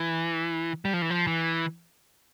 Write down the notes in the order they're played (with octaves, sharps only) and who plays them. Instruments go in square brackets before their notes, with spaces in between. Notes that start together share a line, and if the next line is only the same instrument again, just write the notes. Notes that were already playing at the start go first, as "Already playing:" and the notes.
Already playing: [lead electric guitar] E3
G3
F3
E3
F3
E3